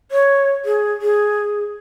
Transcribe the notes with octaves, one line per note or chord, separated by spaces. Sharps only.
C#5
G#4
G#4